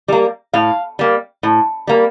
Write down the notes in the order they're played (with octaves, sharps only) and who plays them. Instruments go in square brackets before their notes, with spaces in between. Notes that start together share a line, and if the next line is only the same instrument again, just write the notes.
[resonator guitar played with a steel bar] G3 A#3
A2 F5
G3 A#3
A2
G3 A#3